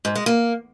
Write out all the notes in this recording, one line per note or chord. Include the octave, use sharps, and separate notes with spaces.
G#2
G#3
A#3